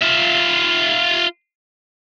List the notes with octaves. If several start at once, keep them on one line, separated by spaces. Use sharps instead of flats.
F4 E5